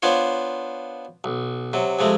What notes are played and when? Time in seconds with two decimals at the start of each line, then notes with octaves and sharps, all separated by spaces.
0.02 B3 D4 F4 C5 C#5
1.24 B1
1.73 C3 F#3
1.99 F2 C3 G#3 A3